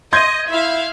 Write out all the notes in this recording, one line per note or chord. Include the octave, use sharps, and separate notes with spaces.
D#5 C6 G6 G#6
E4 E5 F5